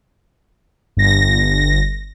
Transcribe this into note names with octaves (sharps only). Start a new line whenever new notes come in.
G1 A#6